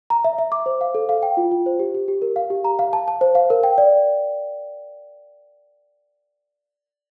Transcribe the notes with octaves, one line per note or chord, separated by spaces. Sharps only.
A#5
E5
E5
D6
C5
F5
A4
F5
G5
F4
F4
C5
G4
G4
G4
A#4
F5
G4
A#5
F5
A5
A5
C5
F5
A#4
G5
D5